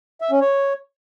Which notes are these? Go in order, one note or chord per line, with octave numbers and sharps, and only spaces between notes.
E5
C#4
C#5